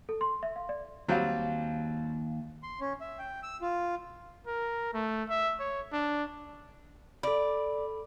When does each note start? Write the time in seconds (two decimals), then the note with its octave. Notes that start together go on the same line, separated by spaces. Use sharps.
0.09 A4
0.21 C6
0.43 E5
0.56 F5
0.69 D5
1.08 D#2 F#3 G3 C4 F5
2.63 C6
2.81 C#4
3.01 E5
3.19 G5
3.43 E6
3.62 F4
4.47 A#4
4.94 A3
5.29 E5
5.60 C#5
5.93 D4
7.23 A4 D5 B5